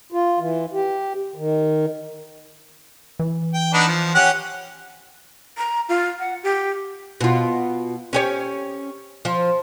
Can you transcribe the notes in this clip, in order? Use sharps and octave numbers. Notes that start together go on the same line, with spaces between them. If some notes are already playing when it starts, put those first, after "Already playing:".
F4
E3
G4
D#3
E3
G5
B3 D4 D#4
F3
C#4 G4 F#5
A#5
F4
F#5
G4
B2 F4
C#4 G4 C#5
F3